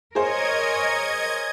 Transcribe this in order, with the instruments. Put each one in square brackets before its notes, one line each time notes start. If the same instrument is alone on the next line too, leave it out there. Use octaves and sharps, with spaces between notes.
[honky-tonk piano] G#4 C5 [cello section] A#4 C#5 [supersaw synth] D#5 G#6